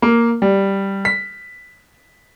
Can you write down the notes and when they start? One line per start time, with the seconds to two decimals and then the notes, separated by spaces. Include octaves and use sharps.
0.02 A#3
0.42 G3
1.05 B6